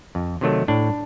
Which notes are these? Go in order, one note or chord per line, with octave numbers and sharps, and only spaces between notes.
F2
C3 D#3 F#3 A3
A2 D4